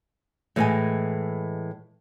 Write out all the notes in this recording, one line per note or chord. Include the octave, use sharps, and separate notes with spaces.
A2 E3 G#3 D5 D#5 G#5